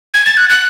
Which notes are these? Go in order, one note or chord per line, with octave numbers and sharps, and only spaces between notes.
G#6
A6
F#6
F#6